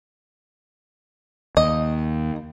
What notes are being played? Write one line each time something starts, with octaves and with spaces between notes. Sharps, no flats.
D#2 D#5